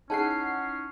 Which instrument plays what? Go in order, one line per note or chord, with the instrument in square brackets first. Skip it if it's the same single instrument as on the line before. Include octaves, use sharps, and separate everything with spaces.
[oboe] C#4 [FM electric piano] D#4 F#5 C7 [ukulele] E4 G#4 C#5 [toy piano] A5